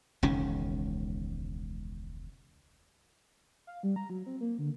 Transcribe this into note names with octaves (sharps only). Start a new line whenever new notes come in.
E1 C#2 D#3 C#4
F5
G3
A#5
F#3
C4
A#3
D3